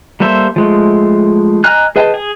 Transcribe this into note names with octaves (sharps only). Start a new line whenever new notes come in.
G3 A#3 A4 C5 E5
F3 G#3 A3
D#5 G#5 A#5 F6 F#6
G#4 B4 D#5 G5 A5
G#4